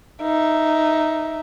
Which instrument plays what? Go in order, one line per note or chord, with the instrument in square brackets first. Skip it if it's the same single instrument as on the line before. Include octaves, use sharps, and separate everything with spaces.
[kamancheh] D#4 E5